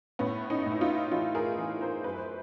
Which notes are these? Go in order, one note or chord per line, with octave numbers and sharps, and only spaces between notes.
A2 B3 C#4
C#4 D#4
A2 D#4
E4
D#4 F4
E3 D#4 F4
G#4 A#4
E3
A#4 C5
F#2 B4
C5